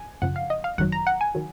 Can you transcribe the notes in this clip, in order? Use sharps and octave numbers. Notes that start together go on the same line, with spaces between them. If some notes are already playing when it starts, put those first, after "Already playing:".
Already playing: G#5
G#1 F#2 C#3 F3 F#5
F5
D#5
F5
G#1 F#2 D#3 F#3 F#5
A#5
F#5
G#5
D#3 F#3